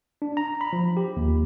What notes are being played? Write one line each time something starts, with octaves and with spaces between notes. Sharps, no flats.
D4
A#5
B5
F3
G4
D#2